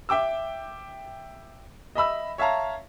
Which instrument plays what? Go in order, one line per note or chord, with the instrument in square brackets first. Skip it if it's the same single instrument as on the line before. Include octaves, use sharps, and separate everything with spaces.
[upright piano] E5 G5 D6 E6
D#5 E5 B5 E6
C#5 E5 F5 A5 A#5